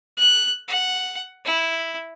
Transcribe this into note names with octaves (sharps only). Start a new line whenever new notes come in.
F#6
F#5
E4